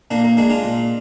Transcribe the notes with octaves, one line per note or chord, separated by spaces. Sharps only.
A#2 A#3 D4
A#3
G#3 A#3 D4
D4 F4
A#2